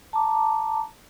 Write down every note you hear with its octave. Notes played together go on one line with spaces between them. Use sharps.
A5 A#5 D6